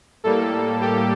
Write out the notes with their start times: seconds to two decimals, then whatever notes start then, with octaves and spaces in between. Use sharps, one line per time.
0.24 A2 G3 A#3 A4
0.81 G4